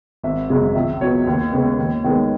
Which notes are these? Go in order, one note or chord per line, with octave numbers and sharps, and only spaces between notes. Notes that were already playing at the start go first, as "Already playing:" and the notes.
G#1 E5
F#2 C#3 G#3
C#2 E5
B2 F#3 B3 C#5
D#2
C#3 G#3 B3
D#2
D#3 G#3 B3